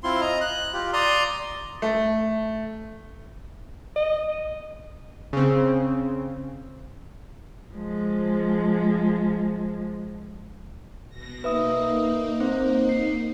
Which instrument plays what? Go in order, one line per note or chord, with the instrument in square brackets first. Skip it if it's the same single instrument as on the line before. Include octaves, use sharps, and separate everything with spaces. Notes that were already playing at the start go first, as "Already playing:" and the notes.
[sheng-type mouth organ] C4 E4 F4 C6
D#5 A#5
F#6
F4 G4
D5 A#5 C6 D#6
[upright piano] A3
[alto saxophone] D#5
[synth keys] C#3 C4
[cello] F3 G#3
[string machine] B2 A#6
[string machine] A#3 D#4 [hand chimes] B4 E5 D#6
[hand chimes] C4 C5
C7